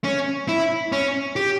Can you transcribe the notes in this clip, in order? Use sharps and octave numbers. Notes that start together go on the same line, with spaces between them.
C#4
E4
C#4
G4